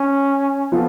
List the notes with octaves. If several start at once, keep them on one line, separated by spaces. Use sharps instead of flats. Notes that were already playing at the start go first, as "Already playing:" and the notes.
Already playing: C#4
F3 B3 F4 A4